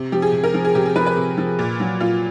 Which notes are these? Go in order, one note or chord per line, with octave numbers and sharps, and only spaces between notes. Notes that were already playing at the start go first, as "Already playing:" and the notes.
Already playing: C3
F3 G4
G#4
C3
A#4
F3
G#4
C3 G4
G#4
F3 B4
B4
C3
F3
A#2
F#3
A#2 F4